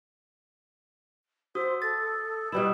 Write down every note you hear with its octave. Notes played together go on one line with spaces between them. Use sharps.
F#4 C5 D#6 E6
A4 A6
B2 G3 E4 B4 E7